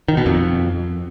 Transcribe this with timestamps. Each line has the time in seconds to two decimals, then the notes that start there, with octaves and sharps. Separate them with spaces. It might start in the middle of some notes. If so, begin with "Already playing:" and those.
0.08 D#3
0.17 B2
0.26 F2